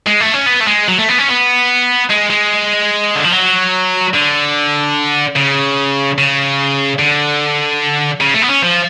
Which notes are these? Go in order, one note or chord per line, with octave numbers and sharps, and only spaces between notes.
G#3
A3
C#4
B3
A3
G#3
F#3
A3
B3
C#4
B3
G#3
G#3
D3
F3
F#3
D3
C#3
C#3
D3
C#3
A3
B3
C#4
F3